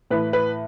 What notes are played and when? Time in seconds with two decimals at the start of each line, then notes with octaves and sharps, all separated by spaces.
0.11 A2 E3 B4
0.33 B4